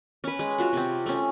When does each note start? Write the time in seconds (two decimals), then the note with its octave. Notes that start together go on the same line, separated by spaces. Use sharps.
0.24 C#4 B4
0.39 G#3
0.58 F4 F#4 F#5
0.73 C3 C4
1.06 A3 C#4